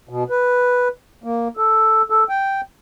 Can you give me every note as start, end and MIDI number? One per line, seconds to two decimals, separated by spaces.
0.09 0.24 47
0.30 0.88 71
1.24 1.48 58
1.57 2.02 69
2.10 2.24 69
2.29 2.61 79